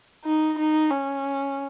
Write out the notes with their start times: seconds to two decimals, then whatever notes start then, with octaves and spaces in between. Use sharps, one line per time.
0.24 D#4
0.58 D#4
0.91 C#4